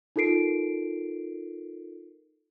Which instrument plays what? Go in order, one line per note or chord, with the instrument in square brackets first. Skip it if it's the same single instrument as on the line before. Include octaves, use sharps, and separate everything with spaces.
[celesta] D#4 F4 A4 A#4 C7 D7